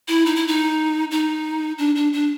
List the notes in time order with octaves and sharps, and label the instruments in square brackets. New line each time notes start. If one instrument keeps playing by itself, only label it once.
[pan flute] E4
D#4
E4
D#4
D#4
D4
D4
D4